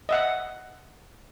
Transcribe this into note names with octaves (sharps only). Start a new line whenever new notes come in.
D#5 E5 F#5